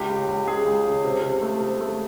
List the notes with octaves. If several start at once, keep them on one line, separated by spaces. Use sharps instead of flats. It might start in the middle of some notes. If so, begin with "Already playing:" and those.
Already playing: C#2 G4
C#3
C#2
C#2 G#4
C#2
C#3
C3
C3
A3
C3
A3